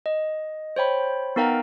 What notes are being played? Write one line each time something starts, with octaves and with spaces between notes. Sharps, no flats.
D#5
C5 C#5 G5 B5
B3 D#4 A#4 F5 G5 A#5